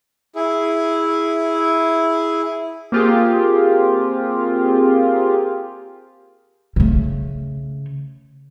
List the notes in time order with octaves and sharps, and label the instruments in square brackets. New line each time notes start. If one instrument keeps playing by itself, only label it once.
[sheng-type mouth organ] E4 G#4
[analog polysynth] A#3 C4 F4 G4 G#4
[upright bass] C#3 A3